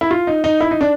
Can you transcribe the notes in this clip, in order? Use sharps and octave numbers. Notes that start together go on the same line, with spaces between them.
E4
F4
D#4
D#4
E4
D#4
D4